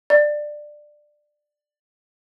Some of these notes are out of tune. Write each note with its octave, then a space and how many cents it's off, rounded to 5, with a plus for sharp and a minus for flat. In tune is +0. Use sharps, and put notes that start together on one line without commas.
D5 +15